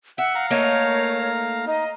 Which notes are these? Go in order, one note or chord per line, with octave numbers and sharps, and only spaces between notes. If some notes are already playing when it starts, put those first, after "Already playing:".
E5 F#5
F5 A#5
A3 A#3 D#4 C#5
D#4 D#5